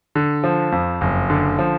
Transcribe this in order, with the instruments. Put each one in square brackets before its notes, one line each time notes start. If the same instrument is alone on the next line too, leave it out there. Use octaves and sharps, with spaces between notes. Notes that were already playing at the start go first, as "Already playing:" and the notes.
[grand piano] D3
F3
F2
F#1
D3
F3